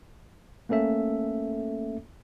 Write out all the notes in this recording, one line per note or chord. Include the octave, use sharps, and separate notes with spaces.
A3 A#3 C#4 A4 E5